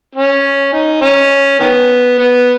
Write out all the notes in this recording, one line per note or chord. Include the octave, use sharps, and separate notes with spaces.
C#4
D#4
C#4
D#3 B3
B3